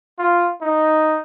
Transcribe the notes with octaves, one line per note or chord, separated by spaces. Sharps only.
F4
D#4